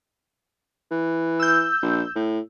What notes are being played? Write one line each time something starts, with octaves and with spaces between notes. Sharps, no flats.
E3
E6 G6
A#1
A2